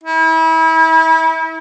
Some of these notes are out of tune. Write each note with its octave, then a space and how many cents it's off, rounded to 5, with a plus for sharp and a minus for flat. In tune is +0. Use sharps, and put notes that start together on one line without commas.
E4 -35